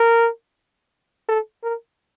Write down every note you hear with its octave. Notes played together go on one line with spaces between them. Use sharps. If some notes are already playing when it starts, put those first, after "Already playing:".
Already playing: A#4
A4
A#4